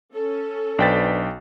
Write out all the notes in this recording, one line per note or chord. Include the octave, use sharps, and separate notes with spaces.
C#4 A4
B1 D4 B4 C5 G5 A6